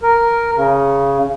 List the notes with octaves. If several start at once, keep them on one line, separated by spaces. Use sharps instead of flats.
A#4
C#3